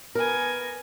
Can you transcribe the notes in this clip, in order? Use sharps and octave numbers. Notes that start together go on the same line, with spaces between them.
B3 A#4 G#5